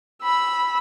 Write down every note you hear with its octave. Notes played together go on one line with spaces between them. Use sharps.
B5 E6